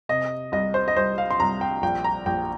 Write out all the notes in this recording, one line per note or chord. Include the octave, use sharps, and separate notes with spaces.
C3 D#5
C2 D#5
C5
D#5
C2 C5
F5
C6
C2 A#5
G5
A#1 G5
A#5
A#1 G5